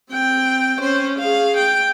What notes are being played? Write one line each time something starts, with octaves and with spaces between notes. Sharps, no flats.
C4 G5
C#4 C5
G#4 F5
G5